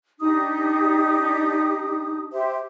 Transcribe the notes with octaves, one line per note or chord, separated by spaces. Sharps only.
D4 D#4 G4 D#6
G4 C5 E5